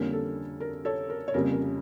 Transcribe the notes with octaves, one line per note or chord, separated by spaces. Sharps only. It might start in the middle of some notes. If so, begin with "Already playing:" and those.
Already playing: F2 D3 G3 A#3 C#4
A4
A#4
A4 C#5
A#4
C#5
F2 C#3 G3 A#3 A#4
A#4